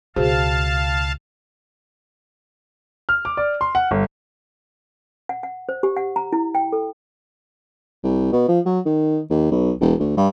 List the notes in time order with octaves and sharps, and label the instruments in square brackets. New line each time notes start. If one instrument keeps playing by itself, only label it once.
[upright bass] C#2 B2 [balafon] F#4 G#4 C5 [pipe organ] F5 A5
[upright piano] F6
D6
D5
C6
F#5
G1
[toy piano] F#5
F#5
C5
G4
F#5
A#5
E4
G5
A4
[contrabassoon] C2
B2
F3
F#3
D#3
D#2
B1
E1
D2
G2